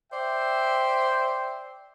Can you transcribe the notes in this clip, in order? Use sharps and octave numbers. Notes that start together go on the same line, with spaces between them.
C5 D5 E5 G5